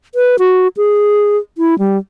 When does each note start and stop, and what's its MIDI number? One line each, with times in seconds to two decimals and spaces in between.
0.15 0.36 71
0.39 0.68 66
0.77 1.37 68
1.58 1.78 64
1.79 1.97 55